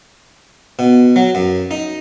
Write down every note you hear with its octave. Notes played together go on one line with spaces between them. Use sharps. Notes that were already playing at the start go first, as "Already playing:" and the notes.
B2
F#3
F#2
D#4